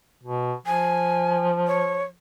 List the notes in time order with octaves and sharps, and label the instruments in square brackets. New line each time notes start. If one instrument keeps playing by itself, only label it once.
[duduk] B2
[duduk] F3 [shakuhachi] G#5
[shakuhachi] C#5